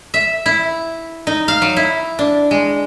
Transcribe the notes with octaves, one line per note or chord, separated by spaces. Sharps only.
E5
E4
D#4
F5
F#3
E4
D4
G#3